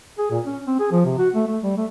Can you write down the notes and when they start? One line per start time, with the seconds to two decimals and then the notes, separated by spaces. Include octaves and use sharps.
0.18 G#4
0.30 A#2
0.45 C#4
0.67 C4
0.80 G#4
0.92 F3
1.05 C3
1.18 F#4
1.35 A3
1.48 A3
1.63 G3
1.77 A3